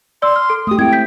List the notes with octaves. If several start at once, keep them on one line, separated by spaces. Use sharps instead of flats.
D5 C6 E6
F6
A4
A3 G4 D#6
G#3 C4 E4 G5 G#6
G6 B6